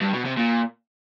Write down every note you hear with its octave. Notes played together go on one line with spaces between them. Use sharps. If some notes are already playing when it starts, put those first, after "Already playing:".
G2
B2
C3
A#2